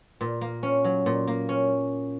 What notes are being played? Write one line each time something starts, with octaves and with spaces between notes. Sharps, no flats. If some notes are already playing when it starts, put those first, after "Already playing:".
A#2
A#3
C#4
F#3
A#2
A#3
C#4